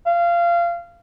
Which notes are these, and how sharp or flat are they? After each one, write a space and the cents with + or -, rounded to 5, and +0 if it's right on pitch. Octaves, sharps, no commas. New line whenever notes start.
F5 -20